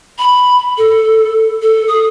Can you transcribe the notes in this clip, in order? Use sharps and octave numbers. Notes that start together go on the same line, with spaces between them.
B5
A4
A4
D#6